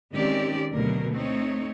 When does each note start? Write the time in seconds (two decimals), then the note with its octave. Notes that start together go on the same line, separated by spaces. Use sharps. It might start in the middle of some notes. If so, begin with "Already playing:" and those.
0.14 D#3 G#3 C4 C#4 G4 D5
0.74 D2 B2 F#3 A#4
1.12 A3 C4 D#4 C#5